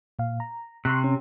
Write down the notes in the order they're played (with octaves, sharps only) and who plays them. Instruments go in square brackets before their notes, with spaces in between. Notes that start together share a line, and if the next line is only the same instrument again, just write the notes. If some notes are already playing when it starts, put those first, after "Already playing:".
[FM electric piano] A#2 F5
A#5
[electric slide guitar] C3 [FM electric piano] C6 C#6 F#6
[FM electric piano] C#4